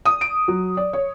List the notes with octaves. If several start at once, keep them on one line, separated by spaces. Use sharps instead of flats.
D#6
D7
F#3
D5
C#5